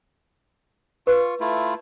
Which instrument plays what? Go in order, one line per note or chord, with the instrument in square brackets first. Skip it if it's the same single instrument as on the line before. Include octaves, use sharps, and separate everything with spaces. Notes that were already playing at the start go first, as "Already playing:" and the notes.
[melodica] F4 C#6 [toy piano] B4
[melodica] A3 E4 F4